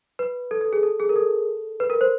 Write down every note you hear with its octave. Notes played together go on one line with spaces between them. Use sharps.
B4
A4
A4
G#4
A4
G#4
A#4
A4
B4
A#4
C5